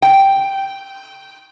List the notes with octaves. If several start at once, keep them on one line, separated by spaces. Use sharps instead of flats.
G5